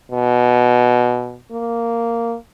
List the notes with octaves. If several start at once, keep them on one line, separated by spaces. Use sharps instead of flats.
B2
A#3